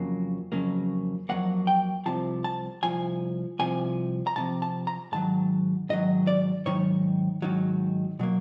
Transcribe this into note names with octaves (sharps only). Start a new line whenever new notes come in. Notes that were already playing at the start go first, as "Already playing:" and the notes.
Already playing: F2 C#3 F#3 A#3
F2 C#3 F#3 A#3
F2 C#3 F#3 A#3 F#5
G5
C2 C3 F3 A5
A5
C2 C3 F3 G#5
C2 C3 F3 G#5
A#5
C2 C3 F3 A5
A5
A#5
G#2 D#3 F#3 A5
G#2 D#3 F#3 D#5
D5
G#2 D#3 F#3 C#5
G#2 D#3 F#3
B2 F#3 A#3